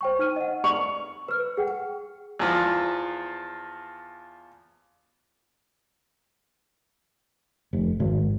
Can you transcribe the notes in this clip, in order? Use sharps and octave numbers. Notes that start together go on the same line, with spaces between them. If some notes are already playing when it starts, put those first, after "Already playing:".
C5 G5 C#6
D#4 F6 D#7
D#5 F#5
D5 C#6 F7 F#7
B4 F6
G#4 F#5 G5
E2 F3
F1
G#1